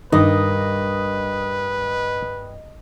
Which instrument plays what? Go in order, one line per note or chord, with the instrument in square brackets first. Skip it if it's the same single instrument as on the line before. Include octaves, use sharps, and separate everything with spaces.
[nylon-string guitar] G2 A#4 [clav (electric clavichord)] D#3 D#4 [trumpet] B4 [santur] D#5